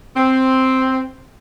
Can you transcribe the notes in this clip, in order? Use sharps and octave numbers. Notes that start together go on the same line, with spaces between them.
C4